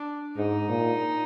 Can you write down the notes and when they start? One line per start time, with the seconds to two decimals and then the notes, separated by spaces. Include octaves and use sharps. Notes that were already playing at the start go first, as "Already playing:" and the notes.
Already playing: D4
0.36 G#2 D#4
0.69 A#2